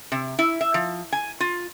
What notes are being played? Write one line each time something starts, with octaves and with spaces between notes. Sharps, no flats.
C3
E4
E5
F3
G#5
F4